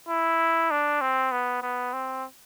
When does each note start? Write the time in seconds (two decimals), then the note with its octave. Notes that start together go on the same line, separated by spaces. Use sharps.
0.09 E4
0.71 D4
1.01 C4
1.32 B3
1.62 B3
1.93 C4